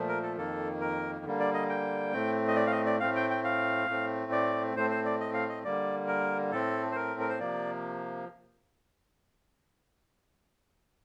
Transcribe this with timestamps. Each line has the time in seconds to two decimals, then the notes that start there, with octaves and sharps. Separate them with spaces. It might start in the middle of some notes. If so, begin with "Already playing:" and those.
Already playing: A#2 F3 A3
0.08 A#4
0.23 A4
0.37 F2 D#3 A#3 A4
0.80 A#4
1.25 D3 G3 A#3
1.40 D5
1.54 D#5
1.69 G5
2.13 A2 A3 C4
2.48 D#5
2.56 D5
2.67 F5
2.71 D#5
2.86 D5
3.00 A2 A3 C4 F5
3.16 G5
3.30 G5
3.44 F5
3.88 A2 A3 C4
4.32 D5
4.75 A2 A3 C4 C5
4.90 C5
5.05 D5
5.20 D#5
5.34 F5
5.49 D#5
5.64 D3 G3 A#3 D5
6.07 A#4
6.52 A2 A3 C4 A4
6.91 C5
6.95 A#4
7.20 A#4
7.29 C5
7.39 C3 F3 A#3 D5